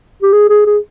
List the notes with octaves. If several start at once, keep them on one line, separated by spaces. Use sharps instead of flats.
G4
G#4
G#4
G#4